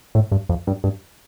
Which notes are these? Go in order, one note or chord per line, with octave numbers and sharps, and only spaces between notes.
A2
G2
F2
G2
G2